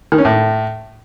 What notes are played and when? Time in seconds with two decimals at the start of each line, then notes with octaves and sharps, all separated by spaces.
0.12 D#3
0.18 C#4
0.25 A2